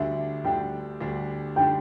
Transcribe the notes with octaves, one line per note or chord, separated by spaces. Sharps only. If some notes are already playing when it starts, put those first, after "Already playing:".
Already playing: D2 D3 G3 D4 E5
D2 D3 G3 D4 G5
D2 D3 G3 D4
D3 G3 D4 G5